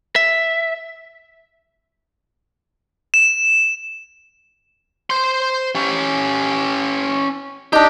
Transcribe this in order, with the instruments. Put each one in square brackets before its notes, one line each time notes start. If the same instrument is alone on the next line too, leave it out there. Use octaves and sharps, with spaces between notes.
[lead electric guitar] E5
[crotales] E7
[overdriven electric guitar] C5 C6
C#4 G4
[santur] D4 D#4 [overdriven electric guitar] G4